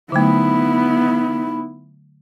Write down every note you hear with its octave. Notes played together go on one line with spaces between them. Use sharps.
D3 F#3 A3 B3 D#4 E4 B5